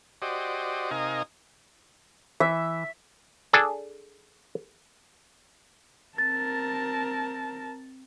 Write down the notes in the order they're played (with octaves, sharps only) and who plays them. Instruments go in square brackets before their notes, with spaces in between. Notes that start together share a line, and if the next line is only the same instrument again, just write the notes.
[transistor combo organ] F#4 G4 C5 D5 D#5
C3 D#4 A#4 D#5 F5 G#5
[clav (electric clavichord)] E3 [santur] E5
[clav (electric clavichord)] D4 G#4 A4
[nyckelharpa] C4 [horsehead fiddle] A#4 A5 [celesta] A6